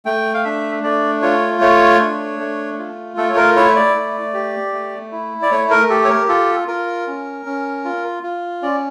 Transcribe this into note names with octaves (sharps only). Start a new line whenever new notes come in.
A3 G5
F5
D4 E5
A3 D5
F4 C#5
A3 C#5
D4
A3
F4
A3 A4
C#5
A#4
E4 C#5
D5
A3
G4
A3
E4
D5
A3 C#5
A#4
G4 A4
C#5
A#4
F4 A4
F4 A#4
C#4
C#4
F4
F4
C#4 D5